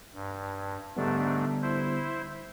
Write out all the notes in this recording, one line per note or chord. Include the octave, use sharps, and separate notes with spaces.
G2
G#2 D3 G3 A3 B3 D4
E4 C5